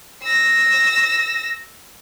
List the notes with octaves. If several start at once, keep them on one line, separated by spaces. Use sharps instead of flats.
E6 A#6